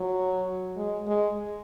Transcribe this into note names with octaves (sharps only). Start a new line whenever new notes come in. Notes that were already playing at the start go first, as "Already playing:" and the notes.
Already playing: F#3
G#3
G#3